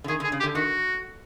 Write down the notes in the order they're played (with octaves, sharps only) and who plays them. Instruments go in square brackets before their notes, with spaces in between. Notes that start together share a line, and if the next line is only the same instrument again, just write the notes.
[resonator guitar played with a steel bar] D3
[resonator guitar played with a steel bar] D#3 [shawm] G#4
[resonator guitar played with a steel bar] D3
[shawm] G#4
[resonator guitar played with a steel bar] C#3
[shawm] G4
[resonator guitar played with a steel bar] D3
[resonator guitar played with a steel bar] D#3 [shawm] F#4